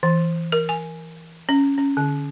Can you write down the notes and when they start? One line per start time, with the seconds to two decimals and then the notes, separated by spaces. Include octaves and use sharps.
0.03 E3
0.52 A#4
0.69 G#5
1.49 C#4
1.78 C#4
1.97 D3